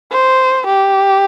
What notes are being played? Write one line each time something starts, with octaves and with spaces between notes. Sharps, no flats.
C5
G4